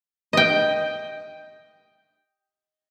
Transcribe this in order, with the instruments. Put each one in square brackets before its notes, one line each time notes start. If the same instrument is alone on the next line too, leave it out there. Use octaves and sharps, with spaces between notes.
[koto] D#5 G5